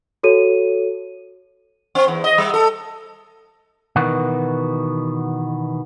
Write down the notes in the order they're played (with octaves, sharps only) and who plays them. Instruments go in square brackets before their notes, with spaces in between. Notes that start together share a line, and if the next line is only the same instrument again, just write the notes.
[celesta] F#4 A4 C#5 D#7
[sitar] C4
E2
D#5
G3
A4
[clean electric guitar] B2 D#3 E3 B3 F#4